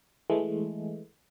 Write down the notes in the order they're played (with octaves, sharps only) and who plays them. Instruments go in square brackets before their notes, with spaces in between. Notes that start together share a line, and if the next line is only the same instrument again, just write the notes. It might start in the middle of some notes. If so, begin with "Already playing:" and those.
[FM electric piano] E3 G#3 A3